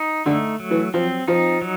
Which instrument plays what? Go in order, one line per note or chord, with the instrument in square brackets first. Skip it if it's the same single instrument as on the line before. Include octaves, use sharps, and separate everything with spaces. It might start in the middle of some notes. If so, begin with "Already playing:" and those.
Already playing: [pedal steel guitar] D#4
[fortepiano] D3 [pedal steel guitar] A3
[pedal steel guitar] F#3
[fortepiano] E3
[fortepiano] F3 [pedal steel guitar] C4
[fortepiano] F3 [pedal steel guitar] D#4
[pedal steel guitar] F#3